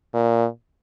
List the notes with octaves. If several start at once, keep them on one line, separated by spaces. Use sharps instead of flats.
A#2